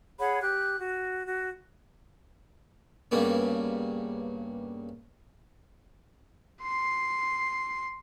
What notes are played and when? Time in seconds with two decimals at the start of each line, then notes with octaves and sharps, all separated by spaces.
0.19 G#4 C#5 F#5 B5
0.42 G4 F#6
0.78 F#4
1.26 F#4
3.11 G2 C#3 A#3 B3
6.62 C6 C7